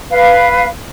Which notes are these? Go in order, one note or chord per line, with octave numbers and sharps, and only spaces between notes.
B4 F5